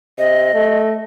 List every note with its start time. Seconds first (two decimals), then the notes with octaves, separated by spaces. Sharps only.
0.18 C3 D#5
0.54 A3